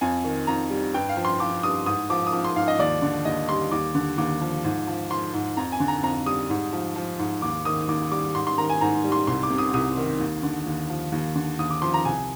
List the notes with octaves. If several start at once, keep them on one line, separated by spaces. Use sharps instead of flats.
F2 G#5
D#3
F2 A#5
G3
G2 G5
F5
F3
C6
F3 D6
G2 D#6
G#2 D#6
F3 D6
D#6
F3 D6
C6
G#2 F5
D#5
D#2 D5
D3
D#2 D#5
G3 C6
D#2 D6
D3
D#2 D6
F3
G#2
F3
F3 C6
G#2
F2 A#5
G#5
D3
A#5
F2 A#5
G3 D#6
G#2
F3
F3
G#2
D#2 D6
D#3 D#6
D#2 D6
G3 D6
G#2 C6
C6
D#3 A#5
G#5
G#2 A#5
G3
C6
C2 C6
D6
C3
D#6
C2 D#6
D#3
D#2
D3
D#2
F3
D#2
D3
D#2 D#6
D6
F3 C6
A#5
C2 G#5